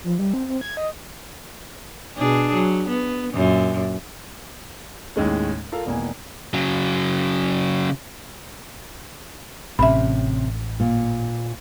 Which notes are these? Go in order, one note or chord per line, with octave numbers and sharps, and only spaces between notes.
F3
G3
C4
C4
G#6
D#5
B2 D4 G#4
F#3
B3
F#2 A#2
D#2 A2 G#3 C#4
F4 A4 A#4 F5
G#1 E2 B2 A#3 G#5
C#3 F#3
A1 C3 C#4 E5 B5
A#2